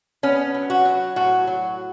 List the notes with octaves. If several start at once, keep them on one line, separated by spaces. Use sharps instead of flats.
B3 C#4
F#3
F#4
F#3
A2 F#4
F#3